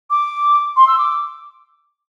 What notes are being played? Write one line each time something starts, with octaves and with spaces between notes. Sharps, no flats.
D6
C6
E6
D6